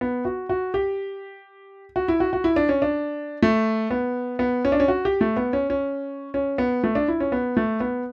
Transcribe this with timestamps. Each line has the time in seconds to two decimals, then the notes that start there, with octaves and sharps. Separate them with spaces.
0.01 B3
0.25 F#4
0.49 F#4
0.74 G4
1.96 F#4
2.08 E4
2.20 F#4
2.33 F#4
2.44 E4
2.56 D4
2.69 C#4
2.82 D4
3.43 A3
3.91 B3
4.39 B3
4.65 C#4
4.72 D4
4.80 C#4
4.88 F#4
5.05 G4
5.21 A3
5.37 B3
5.53 C#4
5.70 C#4
6.34 C#4
6.58 B3
6.84 A3
6.95 D4
7.08 E4
7.20 C#4
7.32 B3
7.57 A3
7.80 B3